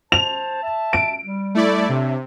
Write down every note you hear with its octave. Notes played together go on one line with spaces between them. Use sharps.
C5 A5 F7
E5 A5
D7
G3
A3 E4 D5
C3 D4 C#5 E5